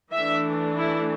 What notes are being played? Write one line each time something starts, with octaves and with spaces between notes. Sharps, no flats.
E3 A3 D4 E5
E4